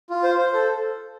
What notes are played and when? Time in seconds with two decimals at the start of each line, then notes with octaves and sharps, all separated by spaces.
0.10 F4
0.23 C5
0.38 C5
0.54 A4